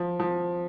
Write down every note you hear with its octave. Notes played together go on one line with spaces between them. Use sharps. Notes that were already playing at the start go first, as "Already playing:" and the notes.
Already playing: F3
F3